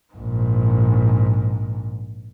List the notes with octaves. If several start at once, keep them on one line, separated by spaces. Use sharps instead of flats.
A#1 G#2